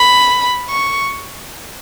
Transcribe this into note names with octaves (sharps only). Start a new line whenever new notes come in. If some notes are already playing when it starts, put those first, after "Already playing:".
Already playing: B5
C#6